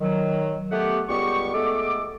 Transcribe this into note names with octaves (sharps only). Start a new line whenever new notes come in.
D#3 F#3
A3 B3 G4 F#5
C#2 G3 B3 G4 C#6
G#3 A3 B3 A4 D6